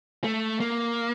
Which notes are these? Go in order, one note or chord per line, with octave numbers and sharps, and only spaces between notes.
A3
A#3